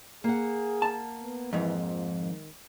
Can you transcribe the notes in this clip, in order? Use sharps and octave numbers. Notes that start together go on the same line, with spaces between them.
A#3 G#4 F#5
A5
B3
F2 G#2 E3
F3
D#3